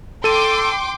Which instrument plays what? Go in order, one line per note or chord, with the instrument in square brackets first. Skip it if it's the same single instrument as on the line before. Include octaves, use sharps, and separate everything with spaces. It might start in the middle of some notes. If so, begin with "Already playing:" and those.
[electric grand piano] A4 D#7 [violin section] G5 C6 D6